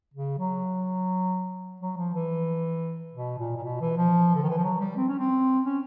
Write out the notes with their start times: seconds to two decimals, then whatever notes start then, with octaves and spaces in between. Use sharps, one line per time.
0.14 C#3
0.38 F#3
1.80 F#3
1.97 F3
2.14 E3
3.13 B2
3.39 A#2
3.57 A#2
3.64 B2
3.81 E3
3.97 F3
4.36 D3
4.43 D#3
4.50 E3
4.57 F3
4.64 F#3
4.80 G3
4.97 C4
5.09 C#4
5.19 C4
5.64 C#4